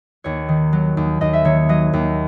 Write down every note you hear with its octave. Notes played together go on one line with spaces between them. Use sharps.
D#2 C#5
D#3
F#3
D#2
D#2 D#5
E5
D#3 C#5
F#3 D#5
D#2